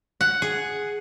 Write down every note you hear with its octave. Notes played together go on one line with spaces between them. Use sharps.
F#5
G#4